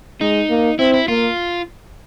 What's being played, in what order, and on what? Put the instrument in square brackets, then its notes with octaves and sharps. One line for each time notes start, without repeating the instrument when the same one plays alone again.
[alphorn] G#3 [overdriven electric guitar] D#4
[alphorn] A#3
[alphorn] C4 [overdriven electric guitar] E4
[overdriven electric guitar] E4
[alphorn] A#3 [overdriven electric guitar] F4